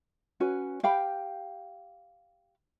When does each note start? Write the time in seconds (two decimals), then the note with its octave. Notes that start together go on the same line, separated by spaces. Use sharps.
0.40 C#4 F#4 B4 G#5
0.83 G4 F5 G5 B5